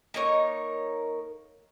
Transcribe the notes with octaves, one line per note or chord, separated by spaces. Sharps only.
A#3 D#4 A#4 C#5